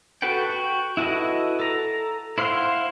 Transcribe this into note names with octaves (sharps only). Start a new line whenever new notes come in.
F#4 A4 B4 F#5 G5
F#4 G5
E4 F#4 A4 B4 D#5
A4 A#5
E4 C5 F5 F#5 C6